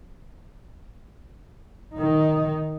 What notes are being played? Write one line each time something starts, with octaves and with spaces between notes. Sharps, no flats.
D#3 D#4